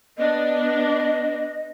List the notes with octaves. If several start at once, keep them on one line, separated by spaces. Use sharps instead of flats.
B3 D4 D#5